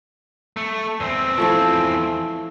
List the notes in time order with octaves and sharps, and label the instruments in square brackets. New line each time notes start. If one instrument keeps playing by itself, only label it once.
[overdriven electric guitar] A3
E2 C4
[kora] F3 A3 E4